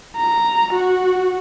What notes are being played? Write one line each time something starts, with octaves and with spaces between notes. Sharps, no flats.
A#5
F#4